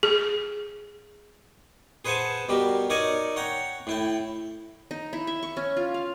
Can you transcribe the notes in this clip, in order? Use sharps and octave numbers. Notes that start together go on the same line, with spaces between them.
G#4
G#4 B4 C5 F#5 G#5 A5
B2 G3 G4 A#4
D#4 A#4 C#5 D5 G#5
C#5 F#5 G5 A#5
A2 E4 G5
D#4
E4
E5
C#6
C#4
F4
F5